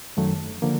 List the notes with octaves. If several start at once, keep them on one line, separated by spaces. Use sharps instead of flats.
F#2 D#3 F#3 A3
D3 F3 A#3